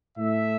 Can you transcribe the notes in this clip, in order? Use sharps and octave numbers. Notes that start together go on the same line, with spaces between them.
A2 A3 E5